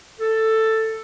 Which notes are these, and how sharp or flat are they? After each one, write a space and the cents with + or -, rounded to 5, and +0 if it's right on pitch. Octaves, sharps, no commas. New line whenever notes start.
A4 +10